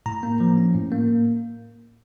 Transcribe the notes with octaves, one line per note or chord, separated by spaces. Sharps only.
A2 A#5
A#3
F3
C#4
A2
A#3